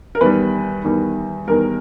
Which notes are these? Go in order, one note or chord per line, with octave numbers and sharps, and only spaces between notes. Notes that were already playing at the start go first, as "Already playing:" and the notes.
A#4
E2 D#3 G3 B4
E2 D#3 G3
E2 D#3 G3 A#4